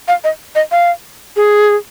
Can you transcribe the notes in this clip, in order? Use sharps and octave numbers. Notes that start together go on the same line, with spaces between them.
F5
D#5
D#5
F5
G#4